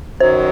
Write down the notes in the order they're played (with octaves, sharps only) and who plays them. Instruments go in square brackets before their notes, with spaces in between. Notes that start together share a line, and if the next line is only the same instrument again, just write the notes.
[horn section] F#2 D#3 F#3 [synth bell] C5